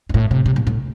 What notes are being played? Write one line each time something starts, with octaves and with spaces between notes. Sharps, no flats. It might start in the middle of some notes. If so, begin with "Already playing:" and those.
G2
A2
C3
C3
A#2
A2